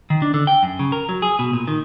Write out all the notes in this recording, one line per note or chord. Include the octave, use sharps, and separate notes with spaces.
D#3
D4
D3
G5
F#2
C#3
A#4
F#3
G#4
B2
A#2
D#3